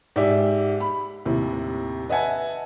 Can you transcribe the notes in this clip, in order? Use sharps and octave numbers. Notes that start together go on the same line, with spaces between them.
G#2 G4 D5 E5
B5
D#2 A2 C3
B4 D#5 E5 F#5 G#5 A5